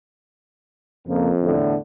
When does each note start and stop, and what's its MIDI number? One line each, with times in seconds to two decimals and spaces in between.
1.08 1.54 41
1.08 1.29 49
1.08 1.29 53
1.08 1.29 58
1.42 1.76 40
1.42 1.76 45
1.42 1.76 50